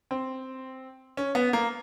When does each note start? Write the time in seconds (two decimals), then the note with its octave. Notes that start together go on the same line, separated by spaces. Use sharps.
0.11 C4
1.17 C#4
1.35 B3
1.53 A#3